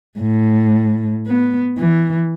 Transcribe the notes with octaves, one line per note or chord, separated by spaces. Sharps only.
A2
B3
E3